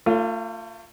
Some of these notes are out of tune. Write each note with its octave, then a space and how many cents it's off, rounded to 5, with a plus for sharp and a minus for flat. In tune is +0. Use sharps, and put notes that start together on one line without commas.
A3 +40 F4 +0